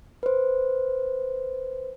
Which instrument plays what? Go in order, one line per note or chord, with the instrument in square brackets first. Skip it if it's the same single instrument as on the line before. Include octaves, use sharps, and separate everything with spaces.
[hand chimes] B4 C5